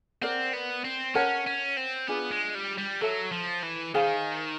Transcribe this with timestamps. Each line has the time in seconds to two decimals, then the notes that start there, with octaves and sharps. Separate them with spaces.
0.22 C4 A#4 D5 F#5
0.53 B3
0.85 C4
1.15 C#4 A#4 C#5 F#5 A5
1.47 C#4
1.77 C4
2.08 B3 D4 F4 G#4
2.32 G#3
2.55 G3
2.78 G3
3.01 F#3 A4 C#5 E5 A5
3.32 F3
3.63 E3
3.94 D#3 G#4 C5 F5 G#5